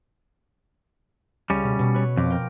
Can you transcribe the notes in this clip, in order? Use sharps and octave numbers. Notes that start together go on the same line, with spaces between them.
C#2 G3 C#4
B2
B2
B4 C#5
F2 F3 D6
A#4 G5